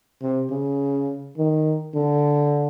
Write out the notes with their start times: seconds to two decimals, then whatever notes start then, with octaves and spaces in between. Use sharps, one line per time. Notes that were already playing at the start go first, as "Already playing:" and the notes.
0.22 C3
0.50 C#3
1.37 D#3
1.94 D3